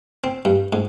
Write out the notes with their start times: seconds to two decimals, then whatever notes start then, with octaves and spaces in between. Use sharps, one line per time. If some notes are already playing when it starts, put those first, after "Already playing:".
0.24 C4
0.45 G2
0.73 G#2